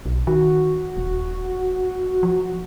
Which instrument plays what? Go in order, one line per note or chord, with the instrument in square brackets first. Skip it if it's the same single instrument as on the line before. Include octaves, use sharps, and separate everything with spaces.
[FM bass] B1
[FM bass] D#3 [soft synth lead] F#4
[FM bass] D#1
F3